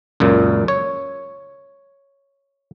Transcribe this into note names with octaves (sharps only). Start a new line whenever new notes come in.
C#2 F#2 A#2
C#5